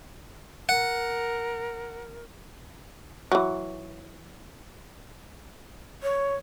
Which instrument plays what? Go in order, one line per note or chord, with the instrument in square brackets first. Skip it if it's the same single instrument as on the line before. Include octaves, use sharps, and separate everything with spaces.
[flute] A#4 [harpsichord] F#5
[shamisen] E3 F#3
[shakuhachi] C#5